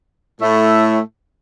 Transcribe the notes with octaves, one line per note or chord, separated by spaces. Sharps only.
A2 A3